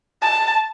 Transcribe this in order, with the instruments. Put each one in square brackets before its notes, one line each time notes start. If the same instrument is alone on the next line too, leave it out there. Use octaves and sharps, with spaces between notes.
[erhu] A5